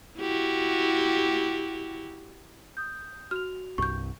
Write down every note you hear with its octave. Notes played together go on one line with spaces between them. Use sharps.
E4 F#4 G4
D#6 G6
F#4 F6 F7
C2 G2 C#6 G6